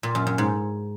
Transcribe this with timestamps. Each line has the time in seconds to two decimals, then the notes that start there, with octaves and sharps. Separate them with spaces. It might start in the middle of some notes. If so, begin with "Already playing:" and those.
0.03 A#2
0.15 F#2
0.27 F#2
0.38 G#2